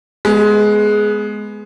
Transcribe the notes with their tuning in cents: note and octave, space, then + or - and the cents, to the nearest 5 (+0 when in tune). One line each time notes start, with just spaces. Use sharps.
G#3 +15 B3 +0